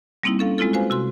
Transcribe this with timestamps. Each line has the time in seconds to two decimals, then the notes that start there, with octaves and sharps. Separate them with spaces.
0.23 G3 A#3 C4 D#4 E4
0.39 C#4 A4 F5
0.58 G#3 C4 E4 F4 A4
0.73 F#4 B4 C5 F5 G#5
0.90 C3 F#4 C6